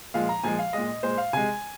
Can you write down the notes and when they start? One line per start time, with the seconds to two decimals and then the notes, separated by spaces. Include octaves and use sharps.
0.14 A#2 F3 G#3 F5
0.29 A#5
0.43 A#2 F3 G#3 G#5
0.59 F5
0.73 A#2 G#3 D#5
1.03 A#2 G#3 C5
1.18 F5
1.33 C3 G#3 G#5